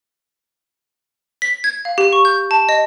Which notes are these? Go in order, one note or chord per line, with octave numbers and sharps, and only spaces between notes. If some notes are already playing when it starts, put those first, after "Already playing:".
B6
G#6
F5
G4
C#6
G6
A5
D#5